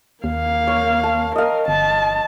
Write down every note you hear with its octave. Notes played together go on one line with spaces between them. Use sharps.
D#2 A#3 F5
C#5
A5
A#4 D#5 F5
G1 A5